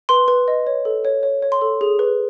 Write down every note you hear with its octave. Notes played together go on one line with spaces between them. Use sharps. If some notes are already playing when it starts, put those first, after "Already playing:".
B4 C6
B4
D#5
C#5
A4
C#5
C#5
C#5
C6
A4
G#4
B4